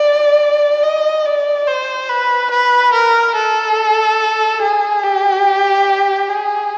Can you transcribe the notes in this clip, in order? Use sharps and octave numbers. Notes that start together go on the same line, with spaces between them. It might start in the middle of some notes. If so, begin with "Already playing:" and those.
Already playing: D5
D#5
D5
C5
B4
B4
A#4
A4
G#4
G4
G#4